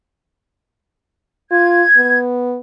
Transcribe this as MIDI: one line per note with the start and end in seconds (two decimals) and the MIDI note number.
1.51 1.84 65
1.51 2.19 92
1.97 2.59 59